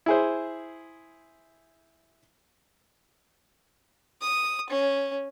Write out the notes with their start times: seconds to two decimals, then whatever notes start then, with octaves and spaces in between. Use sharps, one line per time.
0.06 E4 G#4 C5
4.21 D#6
4.70 C#4